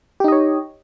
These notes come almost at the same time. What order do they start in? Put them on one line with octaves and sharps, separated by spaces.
G4 D#4 D#5 C#5